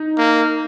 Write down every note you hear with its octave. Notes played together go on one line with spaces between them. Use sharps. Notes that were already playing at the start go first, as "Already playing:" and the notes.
Already playing: D#4
A#3